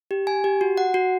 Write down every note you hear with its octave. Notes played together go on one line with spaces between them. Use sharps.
G4
G#5
G4
F#4
F#5
F#4